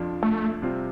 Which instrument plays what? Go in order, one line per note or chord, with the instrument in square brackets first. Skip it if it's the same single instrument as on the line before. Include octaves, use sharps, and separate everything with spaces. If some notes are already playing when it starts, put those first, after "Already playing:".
Already playing: [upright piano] F2 F3 D4 F4
[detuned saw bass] A3
[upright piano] C3 G3 C4 F4